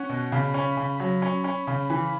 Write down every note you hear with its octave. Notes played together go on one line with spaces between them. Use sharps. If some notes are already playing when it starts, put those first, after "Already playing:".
Already playing: C#4 F#5
B2
C#3 B5
C#4
C#3
F#3 B5
C#4
C#4
C#3 B5
E3